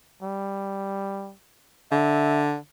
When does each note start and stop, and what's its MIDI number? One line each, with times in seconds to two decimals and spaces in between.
0.22 1.34 55
1.92 2.57 50
1.92 2.44 76